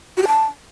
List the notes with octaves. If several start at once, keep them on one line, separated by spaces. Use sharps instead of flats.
F#4
G4
A5